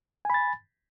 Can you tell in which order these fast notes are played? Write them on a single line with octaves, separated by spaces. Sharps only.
G#5 B5 A6